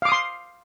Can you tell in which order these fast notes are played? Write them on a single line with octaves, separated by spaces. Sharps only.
F5 D6 D#6 C6